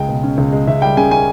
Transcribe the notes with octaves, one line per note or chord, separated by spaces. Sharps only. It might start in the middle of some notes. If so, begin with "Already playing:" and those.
Already playing: C#2 G#3 G5
B2
C#4
C#2
G#3
C#2 E5
G3 G5
C#3 G#5
C#4 G#5